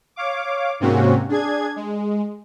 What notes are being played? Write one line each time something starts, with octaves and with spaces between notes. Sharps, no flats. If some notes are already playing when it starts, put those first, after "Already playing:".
C#5 F5 D6
G#2 C3 A#3 C4 C#4 F#4
D4 G#4 G#6
G#3